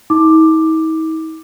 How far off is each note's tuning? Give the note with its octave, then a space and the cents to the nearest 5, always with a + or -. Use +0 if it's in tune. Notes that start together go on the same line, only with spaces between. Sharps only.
D#4 +45 D6 +10